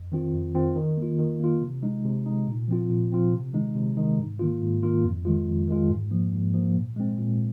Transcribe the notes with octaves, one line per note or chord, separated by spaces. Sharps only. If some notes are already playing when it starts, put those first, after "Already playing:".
Already playing: F2
D#3 C4 F4
F2
D#3 C4 F4
D#3
A#3 F4
D#3
A#3 F4
C3
G#3 D#4
C3
G#3 D#4
A#2
F3 C4 F4
A#2
F3 C4 F4
C3
D#3 G#3 D#4
C3
D#3 G#3 D#4
G#2
D#3 A#3 F4
G#2
D#3 A#3 F4
F2
D#3 G#3 F4
F2
D#3 G#3 F4
G#2
F3 A#3
G#2
F3 A#3
A#2
G#3 C4
A#2